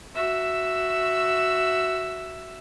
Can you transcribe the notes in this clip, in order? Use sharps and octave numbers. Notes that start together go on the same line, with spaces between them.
F#4 E5 E6